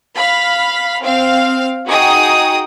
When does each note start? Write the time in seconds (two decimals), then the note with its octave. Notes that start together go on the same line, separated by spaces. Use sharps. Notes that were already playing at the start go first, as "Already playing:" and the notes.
0.15 F5 B5
1.03 C4 F5
1.86 D#4 F#4 G#4 G5 D#6